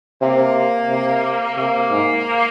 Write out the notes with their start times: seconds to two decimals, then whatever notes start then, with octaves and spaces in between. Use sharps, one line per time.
0.22 C3 A#3
0.90 C3
1.57 C3 A#3
1.91 G#2